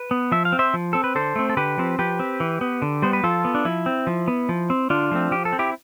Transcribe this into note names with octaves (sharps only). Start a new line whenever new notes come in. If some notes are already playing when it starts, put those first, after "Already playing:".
Already playing: B4
B3
F3 E5
F5
C4
C5 E5
F3
C4 A4
B4
D3 A4 C5
A3 C4
A4
D3 G4 B4
F3 C4
F3 G4 B4
C4
E3
B3
D3
G3 B3 C5
B4
F3 F4 A4
B3
D4
F3 E4
C4
F3
B3
F3
C4
D3 D4 F4
F3 A3 C4
F3 G4
A4
C4
E4 G4